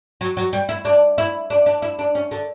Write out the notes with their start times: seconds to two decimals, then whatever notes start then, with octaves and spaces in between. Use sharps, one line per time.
0.21 F#3
0.37 F#3
0.53 G3
0.69 E4
0.85 D4
1.18 E4
1.50 D4
1.66 D4
1.82 E4
1.99 D4
2.15 C#4
2.31 D3